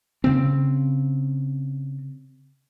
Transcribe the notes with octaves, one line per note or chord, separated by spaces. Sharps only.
C#3 C4